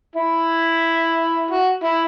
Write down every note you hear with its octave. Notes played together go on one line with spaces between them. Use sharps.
E4
F#4
E4